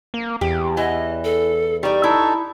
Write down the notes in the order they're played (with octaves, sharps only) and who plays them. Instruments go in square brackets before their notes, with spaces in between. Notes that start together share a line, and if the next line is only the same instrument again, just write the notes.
[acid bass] A#3
[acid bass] E2 [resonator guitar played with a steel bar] G4
[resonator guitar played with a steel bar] E3 [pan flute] D#5
[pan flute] A4
[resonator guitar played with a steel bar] G3 D5 [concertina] D#4 [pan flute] C#6
[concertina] D#4 A4 [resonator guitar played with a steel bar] E4